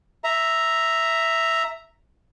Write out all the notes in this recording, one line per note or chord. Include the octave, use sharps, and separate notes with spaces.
E5 A#5